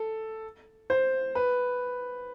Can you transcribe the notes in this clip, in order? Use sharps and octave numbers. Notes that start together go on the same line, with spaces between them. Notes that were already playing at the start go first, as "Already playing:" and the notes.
Already playing: A4
C5
B4